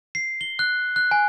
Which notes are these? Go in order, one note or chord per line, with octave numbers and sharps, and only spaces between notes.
C7
G7
F#6
F#6
G#5